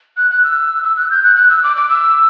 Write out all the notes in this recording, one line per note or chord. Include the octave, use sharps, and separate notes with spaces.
F#6
F#6
E6
E6
F#6
G6
F#6
F#6
E6
D6
D6
E6